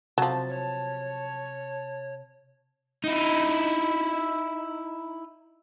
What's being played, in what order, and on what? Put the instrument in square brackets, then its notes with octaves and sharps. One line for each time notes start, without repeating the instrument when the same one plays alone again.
[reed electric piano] C3 [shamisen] F3 F#3 [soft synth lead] A5
[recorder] C#5
[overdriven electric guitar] D#4 E4